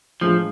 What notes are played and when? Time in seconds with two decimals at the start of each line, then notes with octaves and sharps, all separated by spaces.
0.21 A2 F3 G#3 D4 F4 G#4